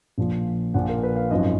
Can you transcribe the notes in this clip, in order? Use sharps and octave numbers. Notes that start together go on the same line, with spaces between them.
A#1 A#2 F3
A#1 A#2 F3 F#5
A#4
B4
F5
G#1 F#2 F3 D#5